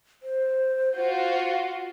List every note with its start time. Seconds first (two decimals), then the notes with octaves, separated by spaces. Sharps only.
0.23 C5
0.96 F4 F#4